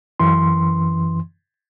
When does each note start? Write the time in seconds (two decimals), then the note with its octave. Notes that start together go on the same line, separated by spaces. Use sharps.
0.19 F#2 E3 C6